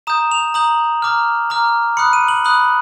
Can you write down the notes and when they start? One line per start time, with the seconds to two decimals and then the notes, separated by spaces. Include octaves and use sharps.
0.07 A#5 D#6 G6 E7
0.32 F7
0.54 A#5 D#6 G6 F#7
1.02 A#5 D6 F6
1.50 A#5 D6 F6
1.97 B5 D#6 F#6 C#7
2.13 D#7
2.28 F#7
2.45 B5 D#6 F#6 F#7